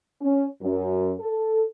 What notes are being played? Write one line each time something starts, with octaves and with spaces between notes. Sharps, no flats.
C#4
F#2
A4